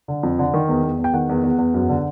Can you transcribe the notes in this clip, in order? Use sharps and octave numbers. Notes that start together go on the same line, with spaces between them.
D3
F2
D3
D#3
E2
E2
E2
G5
D#3 F#5
E2
E2
E2
F#2
D3